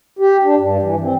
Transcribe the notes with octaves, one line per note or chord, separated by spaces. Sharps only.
G4
D4
G2
E3
C4